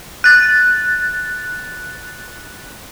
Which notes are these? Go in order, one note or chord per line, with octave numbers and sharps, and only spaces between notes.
F#6 A6